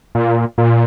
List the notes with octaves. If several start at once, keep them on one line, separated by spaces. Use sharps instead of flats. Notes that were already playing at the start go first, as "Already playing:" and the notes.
A#2
A#2